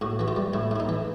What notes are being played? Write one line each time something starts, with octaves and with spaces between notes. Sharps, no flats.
A2 F#4
E3 F#4
F4
G3
A2 E4
A2 E4
D#4
E3